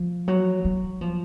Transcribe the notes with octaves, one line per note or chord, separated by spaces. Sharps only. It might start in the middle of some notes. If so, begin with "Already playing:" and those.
Already playing: F3
F#3
F#3
F3